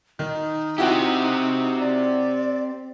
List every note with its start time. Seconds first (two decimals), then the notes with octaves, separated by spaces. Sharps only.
0.19 D#3 D#4
0.78 C4 E4 F#4 G4 G5
1.79 D5